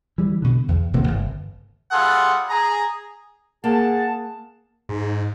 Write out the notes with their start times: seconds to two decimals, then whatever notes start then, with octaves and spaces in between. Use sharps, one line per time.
0.18 E3 G3
0.42 B2 D3
0.68 E2
0.94 D1 C3 E3 A#3
1.08 G1
1.92 G3 F4 G#4 A4 F#5
2.50 G#4 A#5
3.64 A#3 G#4 F#5 A5
4.89 G#2